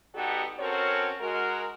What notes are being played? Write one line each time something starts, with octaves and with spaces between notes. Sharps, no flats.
G3 B3 D#4 F#4 G4 A4
C4 C#4 F#4 A4 A#4 C#5
G#3 F#4 A#4